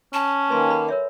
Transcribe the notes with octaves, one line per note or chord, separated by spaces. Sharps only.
C#4 A5
D#3 A#3 B4 G#5 C6
A4 A#5 B5
A#4 C#5 E5